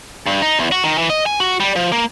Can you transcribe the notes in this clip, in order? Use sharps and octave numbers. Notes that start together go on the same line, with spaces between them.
G2
D#4
E2
F#4
D#3
E3
D#5
G#5
F#4
G3
F3
A#3